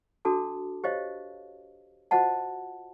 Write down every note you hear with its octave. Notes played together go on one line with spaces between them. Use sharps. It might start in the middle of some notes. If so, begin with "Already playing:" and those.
D4 F#4 A4 A5 D6
G4 C5 C#5 D#5 F5
F4 F#4 C5 D#5 F#5 A5